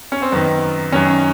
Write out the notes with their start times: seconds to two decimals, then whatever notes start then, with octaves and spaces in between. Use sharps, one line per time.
0.12 C#4
0.22 C4
0.32 F#2 D#3 B3
0.92 F#2 D#3 C#4